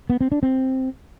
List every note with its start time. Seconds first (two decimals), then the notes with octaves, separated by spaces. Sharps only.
0.10 B3
0.21 C4
0.32 D4
0.43 C4